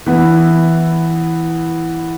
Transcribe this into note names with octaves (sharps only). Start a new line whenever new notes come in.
E3 B3 E4